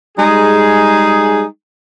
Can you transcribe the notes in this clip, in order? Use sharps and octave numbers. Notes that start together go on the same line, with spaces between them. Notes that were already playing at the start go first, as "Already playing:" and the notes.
G3 G#3 D#4 G#4